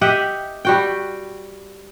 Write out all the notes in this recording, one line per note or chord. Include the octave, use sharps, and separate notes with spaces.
G4 D#5 E5 F#5
G3 F#4 G5